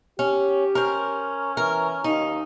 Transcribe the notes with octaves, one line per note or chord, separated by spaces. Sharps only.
C#4 G4
C#4 A#4 C5
E3 A#4
D#2 D#4